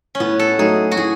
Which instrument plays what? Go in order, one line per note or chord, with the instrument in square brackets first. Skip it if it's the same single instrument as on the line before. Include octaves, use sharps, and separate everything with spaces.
[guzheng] C#4
[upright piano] A2 [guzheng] B3
[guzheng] A4
[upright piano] F#3 A3 D#4 F#4 [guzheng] G#4
[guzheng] F#4
[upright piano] A2 [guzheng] G#4